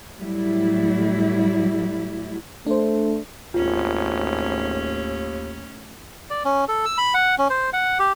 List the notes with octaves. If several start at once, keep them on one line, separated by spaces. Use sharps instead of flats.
A2 F#3 G3 E4
A3 D4 C5
G#1 D#2 A2 C#4 F4
D5
C#4
A4
E6
B5
F#5
C#4
C5
F#5
G4